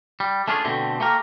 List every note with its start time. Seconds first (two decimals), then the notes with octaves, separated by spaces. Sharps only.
0.20 G3
0.48 A3 C#4 D4 F4 G4 G#4
0.64 B2 D3 A3 C4 G4
1.00 A3 A#3 G4 A#4